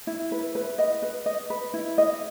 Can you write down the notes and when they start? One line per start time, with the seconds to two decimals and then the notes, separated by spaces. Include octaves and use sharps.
0.07 E4
0.32 B4
0.55 B4
0.78 D#5
1.02 B4
1.26 D#5
1.50 B4
1.74 E4
1.98 D#5